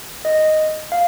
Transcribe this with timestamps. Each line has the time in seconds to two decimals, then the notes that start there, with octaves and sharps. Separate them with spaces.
0.25 D#5
0.92 F5